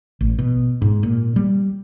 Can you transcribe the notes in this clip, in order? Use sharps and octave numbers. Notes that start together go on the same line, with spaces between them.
A1
B2
G#2
A#2
G3